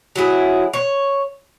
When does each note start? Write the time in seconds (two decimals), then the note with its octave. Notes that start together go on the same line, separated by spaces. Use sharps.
0.16 F#3 E4 G#4
0.73 C#5